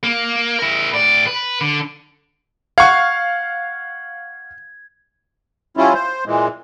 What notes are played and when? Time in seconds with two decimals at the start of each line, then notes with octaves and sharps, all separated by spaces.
0.03 A#3
0.59 E4 A#4
0.94 A2 D5
1.27 B4
1.61 D3
2.78 F5 F#5 C#6 G#6
5.77 G3 C#4 E4 F4
5.94 C5
6.26 A#2 E3 G#3